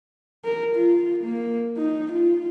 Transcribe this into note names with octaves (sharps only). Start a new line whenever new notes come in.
A#4
F4
A#3
D#4
F4